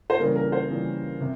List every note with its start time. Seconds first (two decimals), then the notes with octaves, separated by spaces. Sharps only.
0.10 C5
0.19 C#3 E3 G3 A#3 A#4
0.36 A#4
0.52 C5
0.70 C#3 E3 G3 A#3
1.21 C3